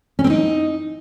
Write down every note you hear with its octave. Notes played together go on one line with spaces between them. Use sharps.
C#4
C4
D#4